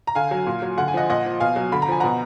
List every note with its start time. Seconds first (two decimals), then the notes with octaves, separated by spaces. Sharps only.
0.07 A#5
0.15 D3 F5 G#5
0.31 F#3
0.47 A#2
0.62 F#3
0.77 D3 F#5
0.88 G#5
0.94 F3 D#5 F#5
1.10 A#2 D#5 F#5
1.26 F3
1.40 B2 F5 G#5
1.56 F#3
1.72 D3 B5
1.82 A#5
1.88 F3 G#5
2.00 B2 F#5 A#5